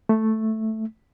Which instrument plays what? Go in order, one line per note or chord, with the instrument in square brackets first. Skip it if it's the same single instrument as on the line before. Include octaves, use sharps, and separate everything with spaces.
[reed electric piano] A3